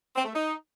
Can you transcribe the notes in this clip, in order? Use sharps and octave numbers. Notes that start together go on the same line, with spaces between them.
C4
A3
D#4